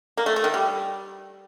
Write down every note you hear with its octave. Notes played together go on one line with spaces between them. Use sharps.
A#3
A3
A3
D#3
G3